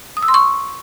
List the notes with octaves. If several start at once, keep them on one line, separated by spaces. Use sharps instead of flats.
D#6
E6
C6
C#6